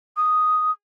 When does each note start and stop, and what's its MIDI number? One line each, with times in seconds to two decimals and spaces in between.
0.17 0.71 87